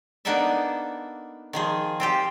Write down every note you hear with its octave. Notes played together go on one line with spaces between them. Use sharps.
A#3 B3 D4 D#4 A4 E5
D#3 F3 G#4
C4 F4 G4